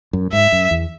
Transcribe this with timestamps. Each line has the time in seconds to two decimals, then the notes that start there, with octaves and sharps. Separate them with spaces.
0.13 F#2
0.33 G#2 E5
0.52 F#2
0.71 E2